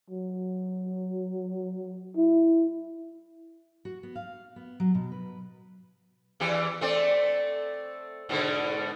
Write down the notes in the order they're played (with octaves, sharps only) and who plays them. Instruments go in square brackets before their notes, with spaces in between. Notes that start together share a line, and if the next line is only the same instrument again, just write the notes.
[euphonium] F#3
E4
[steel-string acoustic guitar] F#4
B3
F5
B3
F#3
B2
B4
[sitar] E2 E3 G4
A3 C4 D5
G#2 B2 D3